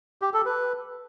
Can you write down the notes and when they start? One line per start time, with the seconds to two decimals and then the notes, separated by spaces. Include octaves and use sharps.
0.22 G4
0.34 A4
0.46 B4